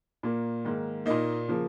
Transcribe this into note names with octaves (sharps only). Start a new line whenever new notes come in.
A#2 A#3
G#2 D#3 A#3
A#2 A#3 D#4 D#5
C#3 F3 A#3